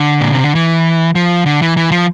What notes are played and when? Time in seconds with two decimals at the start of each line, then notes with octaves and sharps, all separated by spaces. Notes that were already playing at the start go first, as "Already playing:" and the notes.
Already playing: D3
0.21 A#2
0.32 C3
0.43 D3
0.55 E3
1.15 F3
1.46 D3
1.62 E3
1.77 E3
1.92 F3